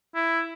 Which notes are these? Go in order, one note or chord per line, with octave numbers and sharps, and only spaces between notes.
E4